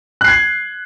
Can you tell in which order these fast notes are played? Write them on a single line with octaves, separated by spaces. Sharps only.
F#6 C7 G#6